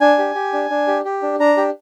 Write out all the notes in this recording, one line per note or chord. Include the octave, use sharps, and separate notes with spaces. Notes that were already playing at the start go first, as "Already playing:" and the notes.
D4 G#5
G4
G4
D4
D4
G4
G4
D4
D4 A#5
G4